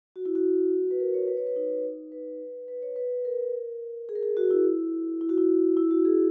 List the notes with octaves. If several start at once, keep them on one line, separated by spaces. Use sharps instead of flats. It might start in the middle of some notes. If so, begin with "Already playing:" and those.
F#4
E4
F#4
B4
A#4
C#5
B4
C#5
B4
D#4
B4
B4
C#5
B4
A#4
G#4
A#4
G#4
F#4
E4
E4
F#4
E4
E4
F#4
G#4